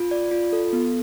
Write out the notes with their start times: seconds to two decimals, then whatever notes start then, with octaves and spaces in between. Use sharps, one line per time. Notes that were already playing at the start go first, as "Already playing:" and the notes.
Already playing: F4
0.11 D5
0.31 F4
0.53 A4
0.73 B3